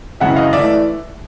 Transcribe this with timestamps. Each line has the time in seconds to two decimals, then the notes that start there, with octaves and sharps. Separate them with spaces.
0.20 F#2 C#3 E3 G#3 E5 F#5
0.36 D#5 F5
0.53 E3 A3 D5 E5